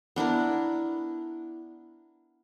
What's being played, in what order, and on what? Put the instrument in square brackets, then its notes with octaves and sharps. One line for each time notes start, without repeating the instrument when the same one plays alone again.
[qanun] B3 D4 E4 A#4